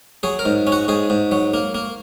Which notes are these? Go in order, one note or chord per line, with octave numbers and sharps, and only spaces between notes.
F#3 G#4
A#4
G#2
C#4
F#4
G#2 G#4
G#2
F#3
A#3
A#3